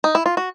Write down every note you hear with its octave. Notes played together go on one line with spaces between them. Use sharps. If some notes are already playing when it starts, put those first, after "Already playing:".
D#4
E4
F4
F#4